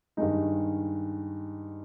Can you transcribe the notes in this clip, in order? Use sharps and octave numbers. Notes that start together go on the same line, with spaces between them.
G2 D#3 G#3 D#4